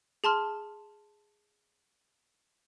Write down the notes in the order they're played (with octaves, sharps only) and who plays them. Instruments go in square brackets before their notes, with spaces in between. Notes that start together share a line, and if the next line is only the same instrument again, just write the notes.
[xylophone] G#4 A5 C6 F6